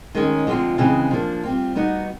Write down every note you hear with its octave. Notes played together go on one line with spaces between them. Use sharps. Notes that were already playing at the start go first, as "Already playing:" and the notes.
D#3 G#3 C#4
D3 F3 G#3 C4 F4
C#3 E3 G#3 C4
F3 A#3 D4
G3 C4 F4
G3 B3 D#4 F#4